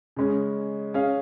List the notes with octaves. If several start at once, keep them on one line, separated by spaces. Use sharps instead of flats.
C#3 G#3 C#4
C#4 G#4 F5